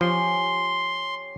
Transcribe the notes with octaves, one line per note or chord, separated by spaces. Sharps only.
F3 C#4 G4 C6